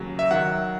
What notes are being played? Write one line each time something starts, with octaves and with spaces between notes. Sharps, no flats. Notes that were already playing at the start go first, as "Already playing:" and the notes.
Already playing: D#2 C#3 F#3
E5
D#3 F#3 F#5